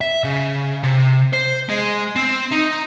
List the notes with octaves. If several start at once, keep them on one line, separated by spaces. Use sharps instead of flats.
E5
C#3
C3
C5
G#3
C4
D#4